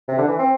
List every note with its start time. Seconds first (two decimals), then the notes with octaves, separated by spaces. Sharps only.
0.08 C3
0.18 D3
0.28 E3
0.39 C4